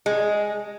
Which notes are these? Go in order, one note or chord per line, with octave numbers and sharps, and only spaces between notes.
G#3